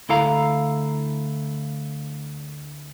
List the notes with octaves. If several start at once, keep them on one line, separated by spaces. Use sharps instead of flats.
D2 E4 A4 F5 A#5